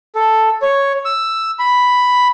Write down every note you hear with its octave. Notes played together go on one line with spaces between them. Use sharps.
A4
C#5
E6
B5